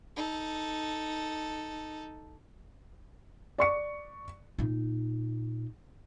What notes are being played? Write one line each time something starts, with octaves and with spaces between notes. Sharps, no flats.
D#4 A4
D5 C#6 C#7
A#2 D#4